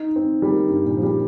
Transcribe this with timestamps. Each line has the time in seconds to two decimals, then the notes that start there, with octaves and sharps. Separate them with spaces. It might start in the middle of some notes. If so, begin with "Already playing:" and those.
Already playing: D#4
0.16 C4
0.42 G3
0.51 A#3
0.68 G2
0.86 A#2
0.97 F3
1.03 G3